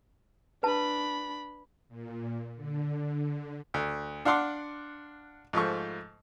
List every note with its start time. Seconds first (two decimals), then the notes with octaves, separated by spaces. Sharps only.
0.63 D4 B4 A5 B5
1.89 A#2
2.56 D3
3.74 D2
4.25 D4 F5 F#5 C6 D6
5.53 G#2 F3 A3 C#6